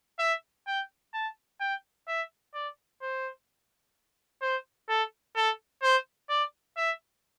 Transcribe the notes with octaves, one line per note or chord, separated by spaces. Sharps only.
E5
G5
A5
G5
E5
D5
C5
C5
A4
A4
C5
D5
E5